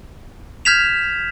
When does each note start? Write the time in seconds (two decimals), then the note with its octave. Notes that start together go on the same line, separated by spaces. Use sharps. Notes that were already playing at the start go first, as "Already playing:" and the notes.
0.65 F6 G6 G#6 B6 E7 F7